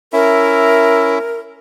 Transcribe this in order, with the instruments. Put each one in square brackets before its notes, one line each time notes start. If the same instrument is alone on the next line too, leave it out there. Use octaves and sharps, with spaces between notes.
[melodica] C#4 E4 E5 [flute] A#4